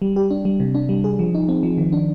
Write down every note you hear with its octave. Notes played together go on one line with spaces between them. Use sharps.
G3
G4
D4
G3
C3
D4
G3
G#4
F3
D#4
C4
F3
D#3
D4